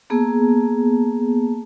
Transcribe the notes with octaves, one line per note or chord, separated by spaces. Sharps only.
A#3 B3 G#4 A5